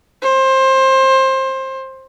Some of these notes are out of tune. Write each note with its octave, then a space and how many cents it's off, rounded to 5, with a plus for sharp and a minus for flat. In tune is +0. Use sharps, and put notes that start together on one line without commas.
C5 +20